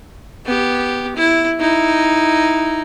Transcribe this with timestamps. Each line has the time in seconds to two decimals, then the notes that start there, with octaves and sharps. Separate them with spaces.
0.46 B3 G4
1.16 E4
1.60 D#4 E4